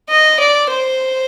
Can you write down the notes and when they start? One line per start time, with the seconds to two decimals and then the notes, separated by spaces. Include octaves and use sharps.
0.10 D#5
0.40 D5
0.70 C5